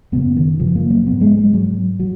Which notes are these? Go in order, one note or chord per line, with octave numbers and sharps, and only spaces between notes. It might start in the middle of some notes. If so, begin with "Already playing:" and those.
F#2 C#3 B3
D#3
F#2 C#3 F3
A#3
F#3
G#2 B3
G#3
G#3
G#2 F#3
F#3